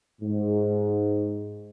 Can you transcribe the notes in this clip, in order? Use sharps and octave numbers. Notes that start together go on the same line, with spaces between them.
G#2